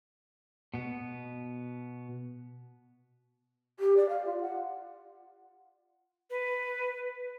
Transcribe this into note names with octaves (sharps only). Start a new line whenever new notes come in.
B2 B3
G4
D5
F5
F4
F#5
B4